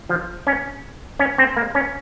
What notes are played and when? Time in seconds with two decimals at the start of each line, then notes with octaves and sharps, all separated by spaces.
0.09 F3
0.47 C#4
1.19 C#4
1.38 C4
1.56 A#3
1.75 C#4